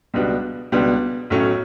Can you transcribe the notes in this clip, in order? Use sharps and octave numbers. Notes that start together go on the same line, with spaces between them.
C#2 B2 G3 B3 D4
C#2 B2 G3 B3 D4
B1 A2 F#3 A3 C#4